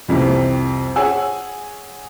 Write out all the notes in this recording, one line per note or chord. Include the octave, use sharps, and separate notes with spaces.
C2 F2 C3 E3
G#4 C#5 F#5 G#5 E6